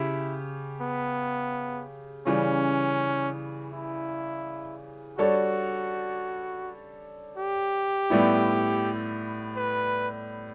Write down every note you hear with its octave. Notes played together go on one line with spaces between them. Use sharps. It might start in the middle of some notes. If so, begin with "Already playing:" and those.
Already playing: C#3 E4 G4
B3
C#3 E3 G3 C#4
E4
G3 D4 F#4 A4 C#5
G4
A2 G3 B3 E4
B4